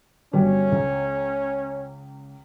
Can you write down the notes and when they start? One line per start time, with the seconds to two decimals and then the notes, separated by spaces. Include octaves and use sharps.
0.33 G1 G3 C#4 F#4
0.72 C#2